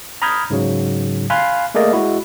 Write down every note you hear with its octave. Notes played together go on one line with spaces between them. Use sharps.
A#5 B5 D#6 F6 G6 G#6
G#2 C#3 F#3
F5 G#5 B5 C6 F6 F#6
A3 A#3 G#4 A#4 D5 D#5
G#3 E4 F#4